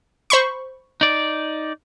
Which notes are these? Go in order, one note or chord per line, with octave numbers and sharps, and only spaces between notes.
C5 B5 C#6
D#4 D5